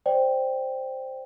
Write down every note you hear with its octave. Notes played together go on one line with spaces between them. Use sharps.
C5 D5 G5